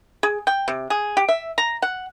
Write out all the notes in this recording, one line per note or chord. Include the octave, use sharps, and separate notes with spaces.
G#4
G5
C3
G#4
G4
E5
A#5
F#5